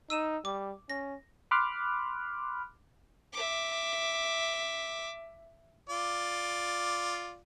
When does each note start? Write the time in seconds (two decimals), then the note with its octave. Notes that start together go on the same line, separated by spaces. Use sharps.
0.10 D#4 E6 D#7 E7
0.45 G3 D6
0.90 C#4 A#6
1.51 B5 C6 D6 F6 F#6
3.33 E5 D6
5.89 F4 D5